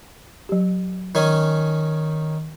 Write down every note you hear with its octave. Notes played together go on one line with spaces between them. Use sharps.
F#3 G4
D#3 C#4 G#5